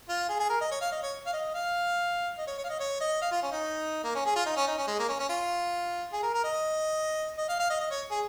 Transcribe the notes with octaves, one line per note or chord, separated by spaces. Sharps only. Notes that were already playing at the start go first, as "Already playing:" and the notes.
F4
G#4
G#4
A#4
D#5
C#5
F5
D#5
C#5
F5
D#5
F5
D#5
C#5
C#5
F5
D#5
C#5
D#5
F5
F4
C#4
D#4
A#3
C#4
G#4
F4
D#4
C#4
D#4
C#4
G#3
A#3
C#4
C#4
F4
G#4
A#4
A#4
D#5
D#5
F5
F5
D#5
D#5
C#5
G#4